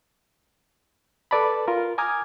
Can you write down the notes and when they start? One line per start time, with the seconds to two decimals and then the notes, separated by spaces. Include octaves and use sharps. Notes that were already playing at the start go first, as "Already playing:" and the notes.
1.31 A4 B4 D5 A5 B5
1.68 F4 A#4
1.98 G#5 A#5 D6 D#6 F6 G#6